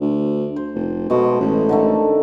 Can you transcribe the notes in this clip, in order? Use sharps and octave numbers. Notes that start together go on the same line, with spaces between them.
D2
C5
F1
B2 G#3 A3
A1
D3 D#3 A3